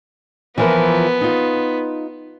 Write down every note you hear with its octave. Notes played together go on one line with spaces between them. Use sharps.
E3 F3 B3 A#4
D#4 F4